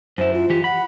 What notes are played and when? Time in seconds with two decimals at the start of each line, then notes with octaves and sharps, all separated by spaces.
0.18 F#2 E4 C5
0.34 F4
0.50 E3 G4
0.64 F#5 B5